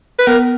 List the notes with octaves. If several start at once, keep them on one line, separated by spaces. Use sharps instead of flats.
B4
B3 A#4